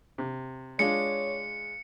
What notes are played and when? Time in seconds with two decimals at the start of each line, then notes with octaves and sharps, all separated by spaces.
0.18 C3
0.79 G#3 D4 F4 C#5 C#7